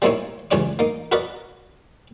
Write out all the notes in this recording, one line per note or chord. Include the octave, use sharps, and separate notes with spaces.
G3 A#3 C4 D#4 E4 C#5
C#2 G2 E3 C#5 D5 D6
A#3 D#4
F#4 A#4 B4 D5 D#5 B5